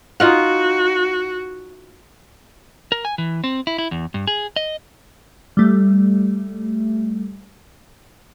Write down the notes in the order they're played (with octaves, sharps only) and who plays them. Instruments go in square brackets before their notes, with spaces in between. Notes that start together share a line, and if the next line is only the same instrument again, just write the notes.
[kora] D#4 F4 F#5 [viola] F#4
[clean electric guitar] A#4
G#5
E3
C4
E4
E4
E2
G2
G#4
D#5
[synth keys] G3 A3